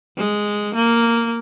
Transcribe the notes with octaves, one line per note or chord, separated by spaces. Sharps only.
G#3
A#3